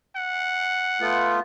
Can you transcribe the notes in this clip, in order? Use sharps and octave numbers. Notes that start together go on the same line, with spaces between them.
F#5
A3 B3 F4